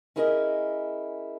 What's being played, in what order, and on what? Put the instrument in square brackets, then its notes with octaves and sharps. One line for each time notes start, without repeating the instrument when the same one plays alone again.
[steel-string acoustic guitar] C#4 E4 G#4 A#4 D5 D#5